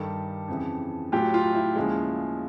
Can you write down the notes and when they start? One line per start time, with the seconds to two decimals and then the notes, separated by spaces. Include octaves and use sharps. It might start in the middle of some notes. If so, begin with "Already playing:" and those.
Already playing: G2 D#3 G3 G4 A4
0.48 F2 C#3 E3
1.12 A2 F#3 F4 G4
1.34 F4
1.55 E4
1.76 D#2 C#3 F3 G#3